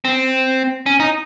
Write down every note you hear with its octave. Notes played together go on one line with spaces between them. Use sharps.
C4
C#4
D#4